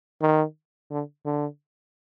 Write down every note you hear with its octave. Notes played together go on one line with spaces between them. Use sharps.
D#3
D3
D3